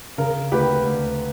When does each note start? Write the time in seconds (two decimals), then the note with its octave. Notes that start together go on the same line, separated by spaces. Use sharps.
0.18 C#3 A#4
0.51 D2 G4 B4
0.85 D2